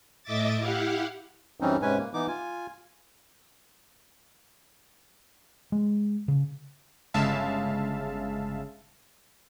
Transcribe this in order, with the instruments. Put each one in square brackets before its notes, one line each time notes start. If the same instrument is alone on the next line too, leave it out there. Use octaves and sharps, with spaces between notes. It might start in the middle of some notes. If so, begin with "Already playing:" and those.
[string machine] A2 D#5 E5 D6 A6
E4 G4 F5 F#5
[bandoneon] F#2 E3 G3 C4 C#4 D#4
G#2 C3 G#3 C#4 B4 G#5
A#3
E3 B3 D#4 D6
F4 G#5
[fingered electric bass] G#3
C#3
[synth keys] G1 C#3 G#3 E5 F5 A5